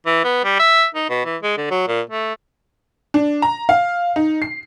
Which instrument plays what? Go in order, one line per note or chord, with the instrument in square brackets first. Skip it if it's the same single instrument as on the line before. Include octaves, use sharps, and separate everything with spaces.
[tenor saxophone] E3
B3
G3
E5
D#4
B2
E3
G#3
D3
F#3
A#2
A3
[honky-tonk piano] D4
A#5
F5
D#4
C7